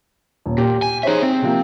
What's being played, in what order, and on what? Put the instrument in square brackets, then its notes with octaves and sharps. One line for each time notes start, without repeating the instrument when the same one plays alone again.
[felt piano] D#1
[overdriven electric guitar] A#2 [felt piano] G4
[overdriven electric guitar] G#5
[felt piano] D#4 C5 C#5 [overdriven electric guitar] G#4 E5
[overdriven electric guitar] C4
[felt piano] C3 F3 A#3